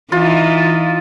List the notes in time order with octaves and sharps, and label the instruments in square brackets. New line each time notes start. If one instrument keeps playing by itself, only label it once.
[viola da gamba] E3 D#4 [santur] F4